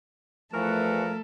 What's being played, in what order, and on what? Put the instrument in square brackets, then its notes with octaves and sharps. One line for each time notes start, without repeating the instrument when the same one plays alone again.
[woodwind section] E2 E3 F#4 [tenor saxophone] F3 [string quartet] A3 A4 [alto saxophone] A#4